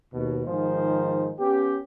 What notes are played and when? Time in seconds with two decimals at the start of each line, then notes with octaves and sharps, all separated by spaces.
0.14 D#2 B2
0.47 G#2 D#3 F3 G#4 C5
1.39 B3 C#4 G4